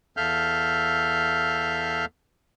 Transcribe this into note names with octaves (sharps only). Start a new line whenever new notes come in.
E2 A4 E5 F5 F6 G6